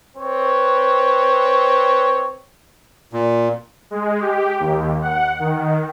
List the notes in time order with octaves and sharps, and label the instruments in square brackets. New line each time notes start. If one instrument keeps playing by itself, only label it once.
[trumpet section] C4 B4 C#5
[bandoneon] A#2
[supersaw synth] G#3
G4
D#2
F#5
D#3